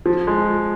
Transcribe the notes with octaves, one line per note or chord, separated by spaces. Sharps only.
F3
G#3